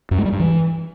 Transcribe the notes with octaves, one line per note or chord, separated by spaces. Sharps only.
F#2
G#3
G3
G2
E3